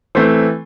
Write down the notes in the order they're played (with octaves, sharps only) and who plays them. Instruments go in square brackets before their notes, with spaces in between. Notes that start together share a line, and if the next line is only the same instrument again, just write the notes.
[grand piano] E3 A3 C4 C5